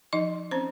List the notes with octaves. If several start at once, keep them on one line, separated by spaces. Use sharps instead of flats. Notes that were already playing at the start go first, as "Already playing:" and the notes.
F3 D#4 D#5
C4 C#4 C5